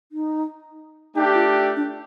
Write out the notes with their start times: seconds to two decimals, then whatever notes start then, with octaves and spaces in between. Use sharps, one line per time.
0.12 D#4
1.15 A3 D4 D#4 G4
1.35 F4
1.76 D4